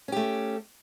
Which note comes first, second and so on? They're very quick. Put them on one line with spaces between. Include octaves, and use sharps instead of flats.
C#4 G4 A3